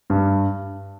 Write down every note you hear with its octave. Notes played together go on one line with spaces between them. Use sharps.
G2